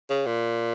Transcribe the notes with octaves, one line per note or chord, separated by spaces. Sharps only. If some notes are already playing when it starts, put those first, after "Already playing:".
C#3
A#2